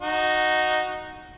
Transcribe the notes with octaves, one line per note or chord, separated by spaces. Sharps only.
D#4 F#4